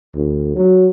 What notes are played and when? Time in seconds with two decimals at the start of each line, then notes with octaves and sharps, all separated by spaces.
0.14 D2
0.55 F#3